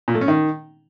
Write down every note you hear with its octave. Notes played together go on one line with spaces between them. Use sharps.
A#2
A3
C#4
D#3